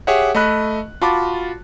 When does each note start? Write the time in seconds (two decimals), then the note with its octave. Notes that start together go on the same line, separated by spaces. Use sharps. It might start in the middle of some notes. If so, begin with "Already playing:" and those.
0.07 G4 G#4 C#5 E5 F#5
0.35 A3 D#5 B5 F#6
1.02 F4 F#4 A5 B5 D6